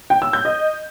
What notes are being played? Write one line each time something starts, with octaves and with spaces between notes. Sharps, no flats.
G5
E6
G6
D#5